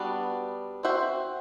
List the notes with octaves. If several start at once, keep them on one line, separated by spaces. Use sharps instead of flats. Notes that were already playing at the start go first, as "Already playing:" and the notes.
Already playing: G3 B3 D4 F#4
C4 F#4 C5 E5